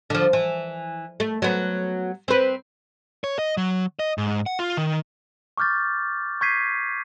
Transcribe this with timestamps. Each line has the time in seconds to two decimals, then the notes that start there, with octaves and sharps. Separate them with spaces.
0.10 D3 F3
0.33 E3
1.20 A3
1.42 F#3 B3
2.28 C4 B4
3.24 C#5
3.39 D#5
3.57 F#3
3.99 D#5
4.18 G#2
4.46 F#5
4.59 F4
4.77 D#3
5.57 C#6 D6 F6 G6 A6
6.41 C#6 G6 G#6 B6 C7 D#7